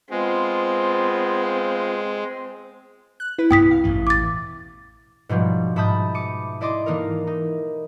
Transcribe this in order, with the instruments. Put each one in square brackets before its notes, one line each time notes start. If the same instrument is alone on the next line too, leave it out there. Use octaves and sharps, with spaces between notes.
[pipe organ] G#3 [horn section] B3 F4 [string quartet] C4
[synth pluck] F#6
E4 B4
[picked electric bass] C2 G2 B3 [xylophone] G5 D#6 B6
[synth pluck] F5
[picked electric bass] E1 A1 E3
[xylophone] D6 A6
[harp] G#2 B2 F3 G3
G#2 E5 A5 B5 D#6 G6
D6 C#7 D#7
E4 D5 D#5 C6 D6
E3 A#3 D#4 A4 A#4
D#4